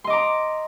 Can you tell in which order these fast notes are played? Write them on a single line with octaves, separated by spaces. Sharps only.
C6 D#5 D6 A#5